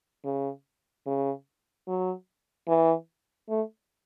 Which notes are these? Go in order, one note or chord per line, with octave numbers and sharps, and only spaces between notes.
C#3
C#3
F#3
E3
A3